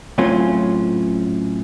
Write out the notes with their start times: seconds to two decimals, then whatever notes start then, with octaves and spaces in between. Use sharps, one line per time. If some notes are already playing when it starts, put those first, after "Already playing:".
0.18 A2 F#3 A3 C4 C#4 F4